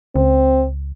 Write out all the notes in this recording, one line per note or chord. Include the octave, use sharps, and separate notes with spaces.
C#2 C4